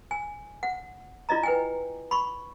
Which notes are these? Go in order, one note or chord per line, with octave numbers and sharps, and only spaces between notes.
G#5
F#5
E4 F4 D5 D#5 A#5
B4 G5 G#5
B5 C#6